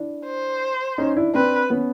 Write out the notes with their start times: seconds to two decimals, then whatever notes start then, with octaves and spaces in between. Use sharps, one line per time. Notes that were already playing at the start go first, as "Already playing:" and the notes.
Already playing: D4 E4
0.26 C5
0.98 C#4 D#4
1.16 D4 E4
1.34 C4 D4 B4
1.70 B3 C#4